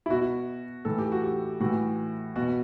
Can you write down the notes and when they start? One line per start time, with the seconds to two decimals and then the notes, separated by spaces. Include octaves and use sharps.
0.06 E4
0.10 B2 F#4
0.85 A2 E3 A4
0.98 G4
1.12 F#4
1.25 G4
1.60 A2 E3 F#4
2.36 B2 F#4